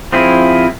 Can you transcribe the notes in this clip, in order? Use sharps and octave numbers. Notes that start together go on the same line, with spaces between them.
F3 C4 E4 G#4